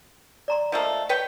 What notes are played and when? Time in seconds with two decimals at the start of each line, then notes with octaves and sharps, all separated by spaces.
0.48 D5 A#5 C6
0.72 F3 A3 A#3 D#5
1.09 B4 C#5 G5